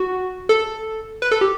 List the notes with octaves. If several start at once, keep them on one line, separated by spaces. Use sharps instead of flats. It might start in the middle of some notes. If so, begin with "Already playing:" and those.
Already playing: F#4
A4
B4
A4
G4